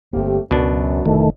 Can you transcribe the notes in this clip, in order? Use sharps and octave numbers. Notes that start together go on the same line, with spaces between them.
G1 A3 A#3 C4 G4
C#2 F#2 B2 F#3 D4
F1 D2 D#3 E3 A3